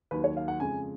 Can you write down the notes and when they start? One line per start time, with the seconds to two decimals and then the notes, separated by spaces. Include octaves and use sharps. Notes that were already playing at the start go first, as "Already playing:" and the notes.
0.11 D#2 D#3 F#3 B4
0.24 C#5
0.37 F5
0.48 F#5
0.60 F2 C#3 G#3 G#5